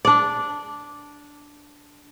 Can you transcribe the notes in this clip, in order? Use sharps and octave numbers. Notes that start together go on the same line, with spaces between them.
D4 D5